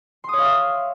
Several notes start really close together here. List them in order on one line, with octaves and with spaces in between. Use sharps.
C6 D#6 C#5 F5 E5